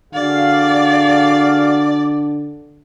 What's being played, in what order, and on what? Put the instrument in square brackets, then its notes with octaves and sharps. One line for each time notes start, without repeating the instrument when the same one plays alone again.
[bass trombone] D3 [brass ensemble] F#4 G#4 F5 [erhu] D5